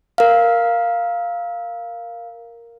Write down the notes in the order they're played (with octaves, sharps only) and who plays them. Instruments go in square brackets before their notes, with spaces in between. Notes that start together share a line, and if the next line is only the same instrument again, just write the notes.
[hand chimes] A#4 F5